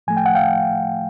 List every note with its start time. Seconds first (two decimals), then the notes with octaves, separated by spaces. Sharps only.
0.07 A2 F3 A3 G#5
0.17 G5
0.26 F#5
0.35 F5 G5